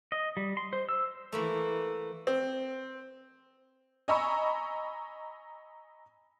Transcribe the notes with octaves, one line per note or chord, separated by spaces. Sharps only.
D#5
G3
C6
C5
E6
E3 A3 A#3 B5
C4
D#5 G#5 A#5 B5 C#6 E6